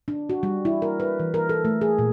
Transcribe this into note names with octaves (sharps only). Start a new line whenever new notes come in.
D4
F#4
G3
E4
A#4
B4
E3
A#4
A4
A3
G#4
A#2